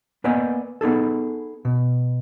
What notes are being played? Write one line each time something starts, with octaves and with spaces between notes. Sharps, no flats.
A#3 B3 B4 D5 D#5 G#5
B3 D#4 G#4 A4
B2